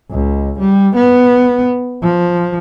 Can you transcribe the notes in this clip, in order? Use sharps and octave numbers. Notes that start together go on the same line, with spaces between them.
C#2
G3
B3
F3